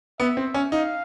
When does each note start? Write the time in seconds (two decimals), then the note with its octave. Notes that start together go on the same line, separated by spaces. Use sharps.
0.20 B3 E5
0.37 C4
0.54 C#4
0.72 D#4 F5